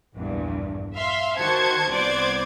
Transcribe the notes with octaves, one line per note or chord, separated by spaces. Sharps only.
A#1 E2 G2
E5 F5 C6
D#3 F#4 C5 A5 G#6 C#7
C2 B3 C5 D5 D6 G#6